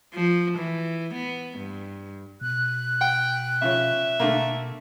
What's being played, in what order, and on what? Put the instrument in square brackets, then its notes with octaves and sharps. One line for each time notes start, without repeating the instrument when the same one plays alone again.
[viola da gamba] F3
E3
B3
G2
[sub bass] B2 [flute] F#6
[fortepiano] F#5 [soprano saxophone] G5
[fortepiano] C#3 F3 C#4 [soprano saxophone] E5
[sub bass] B2 [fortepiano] D3 A3 A#3